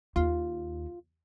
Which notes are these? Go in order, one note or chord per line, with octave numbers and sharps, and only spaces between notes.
D#2 F4